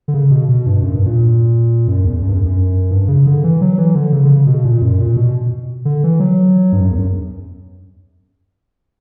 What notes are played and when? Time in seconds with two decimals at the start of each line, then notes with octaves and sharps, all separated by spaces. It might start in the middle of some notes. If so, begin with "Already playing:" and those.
0.08 D3
0.14 C#3
0.31 B2
0.49 B2
0.66 G2
0.83 F#2
0.95 G2
1.06 A#2
1.88 F#2
2.04 E2
2.22 F#2
2.28 G2
2.33 F#2
2.45 F#2
2.91 G2
3.08 C#3
3.27 D3
3.44 E3
3.61 F#3
3.78 E3
3.95 D3
4.13 C#3
4.25 D3
4.29 C#3
4.47 B2
4.65 A#2
4.82 F#2
5.00 A#2
5.17 B2
5.85 D3
6.04 E3
6.20 F#3
6.72 G2
6.81 F#2
6.90 E2
6.99 F#2